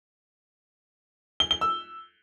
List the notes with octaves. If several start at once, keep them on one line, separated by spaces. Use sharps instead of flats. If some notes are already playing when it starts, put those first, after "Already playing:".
G7
G7
E6